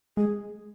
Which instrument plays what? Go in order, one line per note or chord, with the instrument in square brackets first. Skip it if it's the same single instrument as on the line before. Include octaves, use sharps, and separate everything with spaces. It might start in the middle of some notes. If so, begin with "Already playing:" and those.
[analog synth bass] G#3 [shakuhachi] G#4